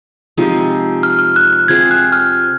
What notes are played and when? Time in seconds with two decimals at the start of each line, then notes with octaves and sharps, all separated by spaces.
0.38 C3 F3 G#3 D#4
1.03 F6
1.19 F6
1.36 F#6
1.53 F#6
1.68 C4 F4 G#4 G#6
1.91 F#6
2.13 F6